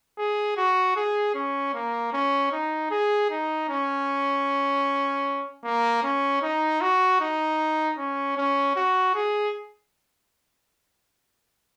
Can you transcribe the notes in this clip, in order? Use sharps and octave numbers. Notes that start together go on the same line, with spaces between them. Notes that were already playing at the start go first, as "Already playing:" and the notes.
G#4
F#4
G#4
C#4
A#3
C#4
D#4
G#4
D#4
C#4
A#3
C#4
D#4
F#4
D#4
C#4
C#4
F#4
G#4